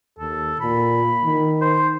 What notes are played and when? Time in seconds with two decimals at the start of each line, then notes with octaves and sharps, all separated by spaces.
0.19 D#2 A4
0.60 A#2 B5
1.24 D#3
1.61 C5